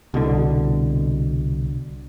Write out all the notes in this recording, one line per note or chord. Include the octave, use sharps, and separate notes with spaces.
C2 B2 D3